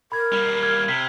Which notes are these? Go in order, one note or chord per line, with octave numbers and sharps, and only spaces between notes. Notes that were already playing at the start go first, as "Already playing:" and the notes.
A#4 B5 G#6
G3 A#3
F6 G#6
C3 B6